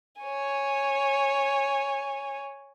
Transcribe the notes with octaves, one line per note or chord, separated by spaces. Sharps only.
C#5 G#5